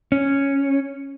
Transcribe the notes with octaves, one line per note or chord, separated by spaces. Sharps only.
C#4